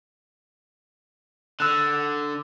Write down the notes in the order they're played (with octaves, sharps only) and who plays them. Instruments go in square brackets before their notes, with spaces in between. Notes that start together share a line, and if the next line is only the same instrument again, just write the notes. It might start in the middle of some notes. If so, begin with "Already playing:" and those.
[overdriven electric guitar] D3 [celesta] E6 F#6